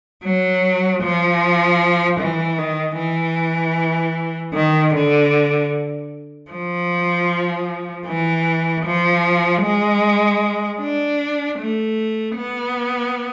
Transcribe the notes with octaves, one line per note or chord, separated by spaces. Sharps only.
F#3
F3
E3
D#3
E3
D#3
D3
F3
E3
F3
G#3
D4
A3
B3